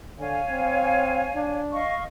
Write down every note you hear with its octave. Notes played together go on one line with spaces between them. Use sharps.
D3 C#5 F5 G#5
C4
D4
D#5 F5 C#6